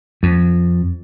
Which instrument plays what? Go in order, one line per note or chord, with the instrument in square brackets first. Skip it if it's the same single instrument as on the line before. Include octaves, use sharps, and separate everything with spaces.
[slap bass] F2